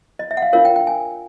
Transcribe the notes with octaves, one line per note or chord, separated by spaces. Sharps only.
D#5
E5
F#5
F5
D4 F4 A#4 C#5 F5
G5
G5
G#5